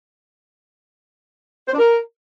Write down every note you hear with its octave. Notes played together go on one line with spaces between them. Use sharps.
C5
D4
A#4